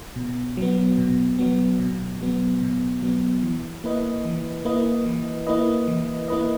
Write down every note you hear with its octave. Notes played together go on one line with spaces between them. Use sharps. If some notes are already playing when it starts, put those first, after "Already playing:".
B2
F#3 B3
B2
F#3 B3
B2
F#3 B3
B2
F#3 B3
E3
A#3 E4 B4 D#5
E3
A#3 E4 B4 D#5
E3
A#3 E4 B4 D#5
E3
A#3 E4 B4 D#5